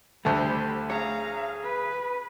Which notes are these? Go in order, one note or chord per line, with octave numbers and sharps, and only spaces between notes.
D2 D3 G3 A3 C5 B5
G#4 C#5 F5 A#5
B4